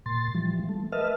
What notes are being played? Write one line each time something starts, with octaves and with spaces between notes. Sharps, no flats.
A#2 C6 A6
E3 F3 G3
A3
A#4 B4 D#5 E5 A5 F6